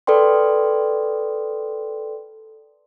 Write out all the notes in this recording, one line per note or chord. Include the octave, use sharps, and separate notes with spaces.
A4 B4 D5 G5 C6